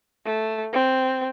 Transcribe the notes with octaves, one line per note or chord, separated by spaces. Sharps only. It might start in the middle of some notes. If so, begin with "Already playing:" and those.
A3
C4